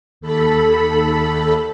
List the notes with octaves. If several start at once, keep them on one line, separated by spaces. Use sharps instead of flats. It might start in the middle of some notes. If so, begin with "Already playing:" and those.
D#2 A4 B5